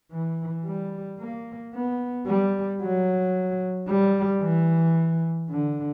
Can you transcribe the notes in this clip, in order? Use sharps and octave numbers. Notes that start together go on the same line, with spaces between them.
E3
G3
A#3
B3
G3
F#3
G3
E3
D3